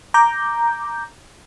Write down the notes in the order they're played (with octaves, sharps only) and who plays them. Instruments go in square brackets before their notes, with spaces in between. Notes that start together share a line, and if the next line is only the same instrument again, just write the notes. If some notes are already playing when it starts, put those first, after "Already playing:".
[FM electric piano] A#5 D6 G6